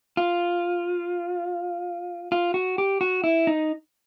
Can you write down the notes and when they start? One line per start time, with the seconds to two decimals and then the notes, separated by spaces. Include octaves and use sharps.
0.17 F4
2.32 F4
2.54 F#4
2.78 G4
3.01 F#4
3.24 E4
3.47 D#4